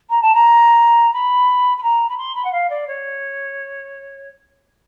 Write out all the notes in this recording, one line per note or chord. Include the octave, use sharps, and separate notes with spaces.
A#5
A5
A#5
B5
B5
A#5
B5
C6
B5
F#5
F5
D5
C#5